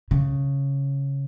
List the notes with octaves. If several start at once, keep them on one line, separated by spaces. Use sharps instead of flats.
C#3